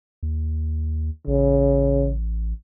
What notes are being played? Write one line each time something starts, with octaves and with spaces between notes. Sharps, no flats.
D#2
A1 C#3